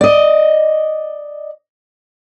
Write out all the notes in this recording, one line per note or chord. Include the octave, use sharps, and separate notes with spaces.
D5 D#5